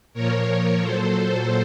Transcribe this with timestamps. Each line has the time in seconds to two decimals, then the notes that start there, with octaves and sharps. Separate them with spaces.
0.14 A#2 F3 A#4 C#5
0.81 A#2 F#3 A4 C5